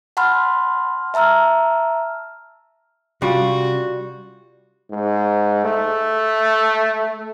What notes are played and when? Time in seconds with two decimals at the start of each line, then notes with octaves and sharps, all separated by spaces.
0.17 F#5 A5 B5 C6 F6
1.14 E5 A5 A#5 E6 F6
3.22 C3 G3 C#4 F4 F#4 F5
4.91 G#2
5.65 A3